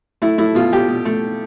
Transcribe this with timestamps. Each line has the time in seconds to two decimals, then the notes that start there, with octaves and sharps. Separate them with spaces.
0.22 A3 E4
0.38 A3 E4
0.55 B2 F4
0.72 B2 G4
0.88 B2
1.05 A3